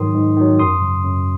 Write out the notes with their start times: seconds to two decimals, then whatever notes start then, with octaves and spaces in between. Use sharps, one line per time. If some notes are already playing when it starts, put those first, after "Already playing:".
Already playing: G#2 D#3 F#3 C6 D#6
0.14 G#2
0.37 D#3 F#3
0.59 F#2 C6 D#6
0.82 C#3 F#3
1.04 F#2